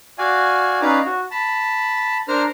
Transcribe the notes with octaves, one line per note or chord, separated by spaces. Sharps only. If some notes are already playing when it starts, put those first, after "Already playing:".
F#4 D5 F5 G#5
C#4 D#4 B4 D5 F5 A#5
F#4
A5 B5
D4 A#4 C5 A#5 F6